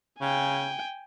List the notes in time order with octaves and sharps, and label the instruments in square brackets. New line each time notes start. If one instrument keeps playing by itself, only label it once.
[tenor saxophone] C#3 [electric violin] G5 G#5